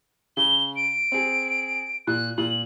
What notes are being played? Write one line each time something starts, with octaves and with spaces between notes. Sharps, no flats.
C#3 G7
D7
C4 G#4
A#2 F#6
A#2 F#7